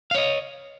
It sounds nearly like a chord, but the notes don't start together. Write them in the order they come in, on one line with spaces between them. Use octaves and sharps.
F5 C#5 D#5